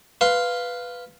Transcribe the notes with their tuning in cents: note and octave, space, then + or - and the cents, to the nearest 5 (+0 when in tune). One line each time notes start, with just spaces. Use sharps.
B4 +0 F5 +0 C6 +0